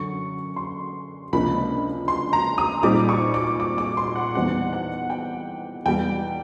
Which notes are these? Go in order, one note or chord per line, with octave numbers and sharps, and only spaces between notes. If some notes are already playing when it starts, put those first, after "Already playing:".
Already playing: F#2 D3 F#3 C#6
C6
C#2 C3 F3 A#3 D4 B5
C6
A#5
D#6
A#2 G3 C4 D#4 D6
C#6
D6
D6
D6
C6
F#5
E2 B2 G3 C4 D#4 F#5
F#5
G5
E2 B2 G3 G5